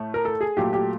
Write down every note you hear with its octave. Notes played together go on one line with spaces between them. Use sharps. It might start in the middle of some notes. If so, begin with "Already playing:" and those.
Already playing: A2 A3
A#4
A4
G#4
A#2 F#3 A3 G4
G4